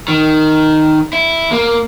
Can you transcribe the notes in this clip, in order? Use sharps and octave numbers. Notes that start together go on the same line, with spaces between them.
D#3
E4
A#3